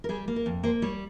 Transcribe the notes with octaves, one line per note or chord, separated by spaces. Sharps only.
A#4
G3 G#4
A#3
A#4
F2
A#3 C5
G3 C#5